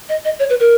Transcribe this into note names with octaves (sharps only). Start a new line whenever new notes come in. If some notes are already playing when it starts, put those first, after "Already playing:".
D#5
D#5
C#5
B4
A#4